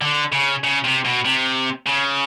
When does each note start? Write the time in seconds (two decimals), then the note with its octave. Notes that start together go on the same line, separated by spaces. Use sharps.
0.01 D3
0.32 C#3
0.64 C#3
0.84 C3
1.05 B2
1.25 C3
1.87 C#3